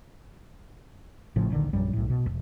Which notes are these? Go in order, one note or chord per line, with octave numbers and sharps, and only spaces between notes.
A1 A2 C#3 F3
D#1 A#1 D3 D#3
A#1 F#2 G3
B1 A2
B2
E1 C2